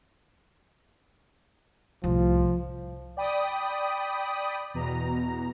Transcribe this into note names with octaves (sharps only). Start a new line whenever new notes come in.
C2 A2 F3
D5 G5 B5 D#6
E2 B2 A#5